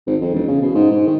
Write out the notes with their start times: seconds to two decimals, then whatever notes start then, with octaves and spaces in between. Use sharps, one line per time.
0.06 G#1
0.21 F2
0.33 E1
0.47 C#3
0.61 B2
0.74 G#2
0.91 G#2
1.06 D#3